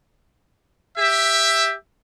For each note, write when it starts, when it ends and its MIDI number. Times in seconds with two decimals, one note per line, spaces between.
0.98 1.74 67
0.98 1.74 76